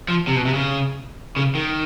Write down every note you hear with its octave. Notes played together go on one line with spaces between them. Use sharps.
F3
C3
B2
C3
C#3
C#3
D#3